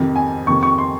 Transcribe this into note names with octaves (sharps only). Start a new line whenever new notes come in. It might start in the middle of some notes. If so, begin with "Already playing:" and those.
Already playing: F2 C3 D#3
G#5
F2 C3 D#3 C#6
C#6
C6